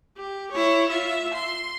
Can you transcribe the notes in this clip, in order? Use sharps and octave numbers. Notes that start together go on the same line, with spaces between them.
G4
E4 C#5
F4 E5
C6